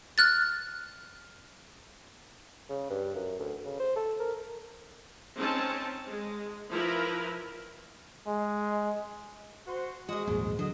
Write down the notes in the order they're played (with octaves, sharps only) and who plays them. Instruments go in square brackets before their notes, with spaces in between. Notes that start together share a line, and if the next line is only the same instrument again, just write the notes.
[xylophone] F6 F#6 A6
[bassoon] C#3
G2
F#2
D2
C#3
C5
A4
A#4
[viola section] C4 C#4 D#4 A5
G#3
F3 E4 A#4 B4
[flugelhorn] G#3
[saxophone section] F#4 C5
[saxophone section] G#3 [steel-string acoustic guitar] F#4 D#5
[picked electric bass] D#1 A#1 [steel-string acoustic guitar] G#2
[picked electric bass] D3 [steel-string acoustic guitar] F#3 [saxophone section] D#5